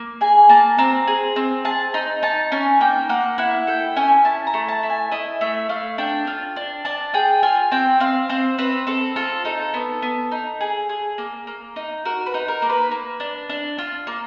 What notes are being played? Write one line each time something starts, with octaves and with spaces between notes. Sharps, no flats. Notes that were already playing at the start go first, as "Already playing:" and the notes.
Already playing: A#3
G#4 G#5
A#3 A5
C4 A#5
G#4
C4
G#4 A5
D#4
D#4 A5
C#4 G#5
A#3 G5
A#3 F#5
E4 F#5
A4 G5
C#4 G#5
E4 A5
A#5
A3
A5
E4
G#5
E4 D#5
A3 E5
A3 F5
D4 G5
F4
D4
D4 A5
G#4 G5
F4 G#5
C4 G5
C4 F5
C4 C5
C4 B4
C4 A4
F4 A4
D#4 A4
B3
B3
D#4
G#4
G#4
A#3
A#3
D#4
F#4 A#4
B4
D#4
A#4
A#3
B4
A#3
D4
D4
F4
A#3